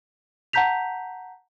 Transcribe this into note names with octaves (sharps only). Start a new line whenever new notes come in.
F#5 A5 A#5 G6 B6 F7